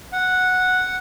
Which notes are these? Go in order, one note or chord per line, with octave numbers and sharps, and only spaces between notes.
F#5